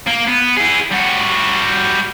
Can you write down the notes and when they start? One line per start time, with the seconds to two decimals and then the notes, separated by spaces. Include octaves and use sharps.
0.07 A#3
0.27 B3
0.57 E4 G#4
0.92 G3 F#4